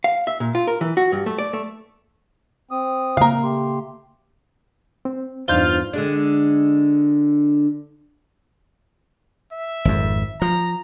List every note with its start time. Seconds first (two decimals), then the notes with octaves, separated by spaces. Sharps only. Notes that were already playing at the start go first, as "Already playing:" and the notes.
0.04 F5
0.27 E5
0.40 A#2
0.55 F4
0.68 A#4
0.81 E3
0.97 F#4
1.12 G2
1.26 A3
1.38 D5
1.53 A3
2.71 C4 D#6
3.17 C#3 A#3 A#4 F5
3.43 A3 G4 C6
5.05 C4
5.48 E2 G2 D4 D#4 F4 C5 G6 G7
5.93 D3 G#3 D4
9.53 E5
9.85 G#1 F2
10.42 F3 A#5